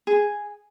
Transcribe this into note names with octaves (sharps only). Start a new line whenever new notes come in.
G#4